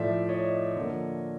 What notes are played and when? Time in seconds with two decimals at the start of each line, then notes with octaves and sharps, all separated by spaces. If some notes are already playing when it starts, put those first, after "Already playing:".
Already playing: A2 F3 A3 D5 E5
0.29 C#5 D#5
0.76 D3 F3 A#3